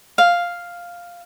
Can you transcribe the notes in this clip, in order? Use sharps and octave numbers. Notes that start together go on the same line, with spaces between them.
F5